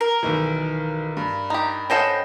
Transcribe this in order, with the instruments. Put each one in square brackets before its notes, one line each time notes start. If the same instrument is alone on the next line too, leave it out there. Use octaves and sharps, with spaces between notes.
[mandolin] A#4
[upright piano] B1 D#3 E3
G2
[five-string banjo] D#4 G4
[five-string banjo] C#4 A4 F#5 [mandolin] C5 D#5 G5